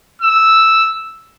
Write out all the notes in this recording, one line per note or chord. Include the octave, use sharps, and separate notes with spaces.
E6